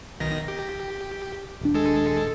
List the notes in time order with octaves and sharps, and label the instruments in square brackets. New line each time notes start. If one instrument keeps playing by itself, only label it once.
[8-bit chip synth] B1 D#3 A#6
G4
[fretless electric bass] D#1 D4
[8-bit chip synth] G#3 A4